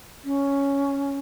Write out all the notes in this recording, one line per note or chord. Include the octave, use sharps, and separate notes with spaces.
C#4